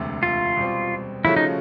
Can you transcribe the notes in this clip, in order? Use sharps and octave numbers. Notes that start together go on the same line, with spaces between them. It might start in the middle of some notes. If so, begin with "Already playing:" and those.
Already playing: E1 D2 C3
F4
B2 G3 C4
C#3 F3 A3 C#4 E4 F#4
D#4